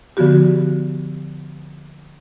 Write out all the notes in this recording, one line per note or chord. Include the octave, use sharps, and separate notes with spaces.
D3 F3 B3 F#4 G4